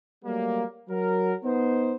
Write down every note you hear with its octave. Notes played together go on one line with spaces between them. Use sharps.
F#3 G3 A3 A#3
F#3 A#4
B3 D#4 C5